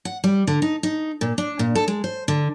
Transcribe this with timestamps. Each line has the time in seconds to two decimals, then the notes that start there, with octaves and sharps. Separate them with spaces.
0.05 F#5
0.24 G3
0.47 D3
0.62 D#4
0.83 D#4
1.21 A#2
1.38 D4
1.59 A#2
1.75 A4
1.88 G#3
2.04 C5
2.28 D3